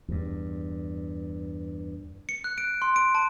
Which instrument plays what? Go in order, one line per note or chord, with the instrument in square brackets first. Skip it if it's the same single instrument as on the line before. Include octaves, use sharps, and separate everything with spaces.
[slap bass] E2 G2
[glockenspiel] C#7
F#6
D7
C6
D7
A5